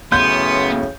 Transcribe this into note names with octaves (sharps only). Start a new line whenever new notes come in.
F#2 A2 C#3 B3 C6 G6